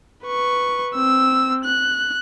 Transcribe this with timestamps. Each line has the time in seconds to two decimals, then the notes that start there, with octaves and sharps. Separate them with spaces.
0.24 B4 C#6
0.95 C4 E6
1.65 F#6